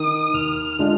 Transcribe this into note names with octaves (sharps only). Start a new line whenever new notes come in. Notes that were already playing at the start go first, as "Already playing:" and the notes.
Already playing: D#3 D#6
D#2 F6
D3 G#3 D4 F4